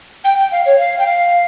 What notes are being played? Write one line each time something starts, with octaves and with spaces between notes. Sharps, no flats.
G5
G5
F5
C#5
F5
G5
F5